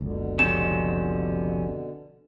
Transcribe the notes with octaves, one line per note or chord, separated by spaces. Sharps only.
F#1 C#2 B2 D3
F2 C3 C#4 E7